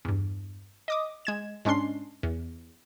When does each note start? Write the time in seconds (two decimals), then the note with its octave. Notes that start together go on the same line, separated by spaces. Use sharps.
0.05 E2 G2
0.88 D#5 D6 D#6
1.25 G#3 G#6 E7
1.65 G#2 G#3 C#4 D4 C6 C7
2.23 E2